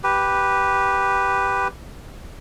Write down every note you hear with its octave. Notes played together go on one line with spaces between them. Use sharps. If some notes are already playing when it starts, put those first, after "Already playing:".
G4 B4